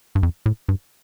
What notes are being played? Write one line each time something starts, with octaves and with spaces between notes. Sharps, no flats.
G2
F2
A2
G2